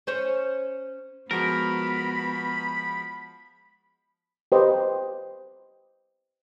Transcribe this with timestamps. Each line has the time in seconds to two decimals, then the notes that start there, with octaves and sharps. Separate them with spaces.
0.07 C#4 C5 C#5
1.31 F3 G#3 B3 F#4 A#4 B5
4.52 G4 B4 C5 D#5